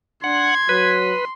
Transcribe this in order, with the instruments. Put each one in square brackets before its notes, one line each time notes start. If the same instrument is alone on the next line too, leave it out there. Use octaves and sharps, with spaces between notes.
[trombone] D4 [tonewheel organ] F#5 [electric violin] C6 [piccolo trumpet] G#6
[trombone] F#3 [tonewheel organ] B4